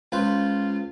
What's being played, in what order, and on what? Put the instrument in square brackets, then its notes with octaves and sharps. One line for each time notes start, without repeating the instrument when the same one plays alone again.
[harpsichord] C#2 B4 C5 [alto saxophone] F4